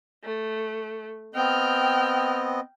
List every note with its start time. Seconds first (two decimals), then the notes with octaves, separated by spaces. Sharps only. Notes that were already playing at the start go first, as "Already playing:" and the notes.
0.24 A3
1.35 B3 C4 D#5 G5 F6